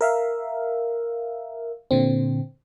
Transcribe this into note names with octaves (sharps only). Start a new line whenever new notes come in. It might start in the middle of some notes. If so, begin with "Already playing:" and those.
A#4 E5 F5
A#2 D3 C4